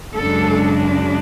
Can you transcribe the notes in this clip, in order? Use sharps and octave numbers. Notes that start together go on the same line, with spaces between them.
F#2 C#3 G#3 D4 A4